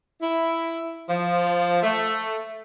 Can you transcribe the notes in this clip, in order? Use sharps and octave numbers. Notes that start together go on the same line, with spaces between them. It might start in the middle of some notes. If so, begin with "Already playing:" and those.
E4
F3
A3